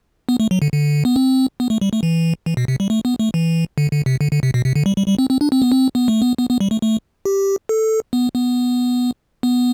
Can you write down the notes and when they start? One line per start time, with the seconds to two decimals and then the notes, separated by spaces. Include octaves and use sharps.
0.29 B3
0.40 A3
0.51 F#3
0.62 D3
0.72 D3
1.05 B3
1.16 C4
1.60 B3
1.70 A3
1.81 G3
1.93 A3
2.03 E3
2.46 E3
2.57 B2
2.68 C3
2.80 G3
2.90 A3
3.05 B3
3.19 A3
3.34 E3
3.78 D3
3.92 D3
4.06 C3
4.21 D3
4.32 D3
4.43 C3
4.54 B2
4.65 C3
4.75 D3
4.86 G3
4.97 G3
5.08 G3
5.19 C4
5.30 C4
5.41 D4
5.52 C4
5.62 B3
5.72 C4
5.95 B3
6.08 A3
6.22 B3
6.38 B3
6.50 B3
6.61 G3
6.71 A3
6.82 A3
7.25 G4
7.69 A4
8.13 B3
8.35 B3
9.43 B3